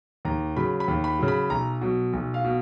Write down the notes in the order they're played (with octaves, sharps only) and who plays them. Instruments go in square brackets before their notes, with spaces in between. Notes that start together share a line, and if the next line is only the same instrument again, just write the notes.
[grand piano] D#2 A#5
C#3 F#3 B5
B5
D#2
B5
C#3 F#3
B5
B1 A#5
B2 F#3
B1
F5
B2